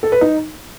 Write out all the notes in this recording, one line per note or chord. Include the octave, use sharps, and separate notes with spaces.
A4
B4
D#4